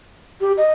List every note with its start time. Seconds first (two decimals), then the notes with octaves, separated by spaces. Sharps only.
0.41 G4
0.57 D#5